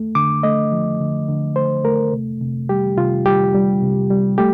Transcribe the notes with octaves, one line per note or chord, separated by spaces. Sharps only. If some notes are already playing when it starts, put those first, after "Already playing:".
Already playing: A3
D3 D6
A3 D#5
F3
D3
D3
A3 C5
A3 A#4
C3
C3
G3 G4
C3 F4
G3 G4
G3
C3
G3
A3 G4